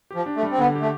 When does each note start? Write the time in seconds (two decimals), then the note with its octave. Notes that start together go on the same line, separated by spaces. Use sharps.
0.11 F3 G4
0.26 D4
0.36 A3
0.43 G3
0.51 C4
0.58 D3 B3
0.75 G4
0.81 A3